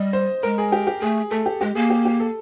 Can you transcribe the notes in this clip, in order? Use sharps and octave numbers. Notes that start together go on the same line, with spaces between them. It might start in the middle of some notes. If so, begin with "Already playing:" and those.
Already playing: G3 D#5
C5
G#3 A#4
G#4
G4
G4
A3 G#4
A3 A4
G4
G#3 G4
A#3 G#4
G4
G4
A4